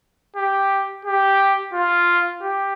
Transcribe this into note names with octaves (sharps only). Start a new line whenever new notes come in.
G4
G4
F4
G4